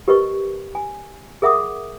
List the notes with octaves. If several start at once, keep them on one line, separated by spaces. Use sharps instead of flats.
G4 A#4 B4 D#5 C#6
G#5
G#4 A#4 E5 F#5 D6 D#6